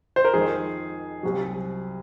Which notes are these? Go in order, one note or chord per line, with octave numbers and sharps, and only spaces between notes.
C5
A#4
F2 D#3 G#3 G#4
C2 C3 F#3